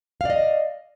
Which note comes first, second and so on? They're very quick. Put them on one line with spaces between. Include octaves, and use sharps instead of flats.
F5 D5 D#5